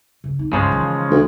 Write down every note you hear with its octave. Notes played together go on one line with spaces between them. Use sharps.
C#3
D#4
C#2 G2 C#3 F3 G#3
D#3 E3
D2